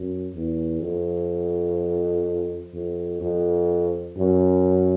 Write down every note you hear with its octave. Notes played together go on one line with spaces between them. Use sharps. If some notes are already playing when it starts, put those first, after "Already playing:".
Already playing: F#2
E2
F2
F2
F2
F#2